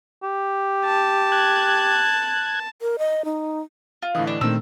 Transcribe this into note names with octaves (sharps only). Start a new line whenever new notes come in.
G4
A5
F#6 G#6
A#4
D#5
D#4
F4
A2 D3 E3 D#5 D#6
D4
A#2 D#3 A3 C4 D4 E6